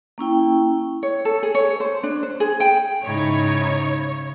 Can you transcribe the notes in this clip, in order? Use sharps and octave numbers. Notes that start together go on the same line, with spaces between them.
A#3 C#4 E4 G5
C#5
A4
G#4
C#5
C5
D4
C5
G#4
G5
G#2 C#3 D#4 E4 C#5